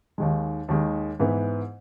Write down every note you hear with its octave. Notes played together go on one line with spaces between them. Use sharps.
D#2 D#3 G#3
D#2 D#3 G#3
G#2 E3 B3